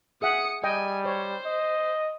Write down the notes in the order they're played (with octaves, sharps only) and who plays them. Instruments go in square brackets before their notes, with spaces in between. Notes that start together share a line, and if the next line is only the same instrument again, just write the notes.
[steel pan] G#4 E5 F#5 [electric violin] D#6 C#7
[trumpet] G3 [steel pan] D#5 G5 [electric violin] G#5
[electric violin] C5 [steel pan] C#5
[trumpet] D#5